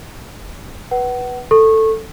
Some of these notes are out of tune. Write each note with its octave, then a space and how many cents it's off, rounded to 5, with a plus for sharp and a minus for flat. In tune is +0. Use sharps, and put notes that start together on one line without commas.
B4 -10 F#5 +30
A4 +10 C#6 -20